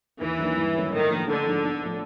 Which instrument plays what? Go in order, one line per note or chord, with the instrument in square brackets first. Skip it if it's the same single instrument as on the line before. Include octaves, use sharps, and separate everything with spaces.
[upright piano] D#2 [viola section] E3
[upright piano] D#3 F#3 A#3 D4
G2
D3 F#3 A#3 C#4
[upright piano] A2 [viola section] D#3
[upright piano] F3 A#3 D4
[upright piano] A1 [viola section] D3
[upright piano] G#2 F3
B1
A2 F3 A3